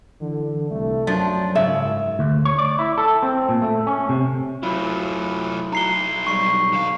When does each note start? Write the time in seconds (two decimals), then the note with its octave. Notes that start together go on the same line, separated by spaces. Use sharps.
0.21 D3 E3
0.70 C2 A3
1.07 F#2 F3 F#3 D4
1.55 G#2 C#3 E5
2.19 D2
2.45 C#5
2.58 D5
2.79 E4
2.98 A4
3.23 C4
3.49 A#2
3.62 A3
3.87 C#4
4.09 C3
4.63 F#3 A3 E4 F4
5.73 D#4 F#4 A#5 C7 G7
6.27 B1 G3 C#6 C7
6.73 D3 F5